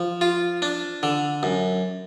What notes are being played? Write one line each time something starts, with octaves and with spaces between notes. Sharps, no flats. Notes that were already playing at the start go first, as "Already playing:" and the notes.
Already playing: F3
F4
D4
D3
F#2